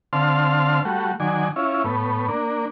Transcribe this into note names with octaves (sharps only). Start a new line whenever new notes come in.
D3 C4 F5 A5 C6 F6
G3 A3 F#4
D#3 F#3 D5 G#5
C#4 E4 F4
A2 B3
A#3 D4